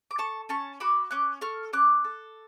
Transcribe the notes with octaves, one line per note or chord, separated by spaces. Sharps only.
D6
A4 A5 C#6
C#4 A5 C#6
F#4 B5 D6
C#4 D6 F#6
A4 C#6 F6
C#4 D6 F#6
A4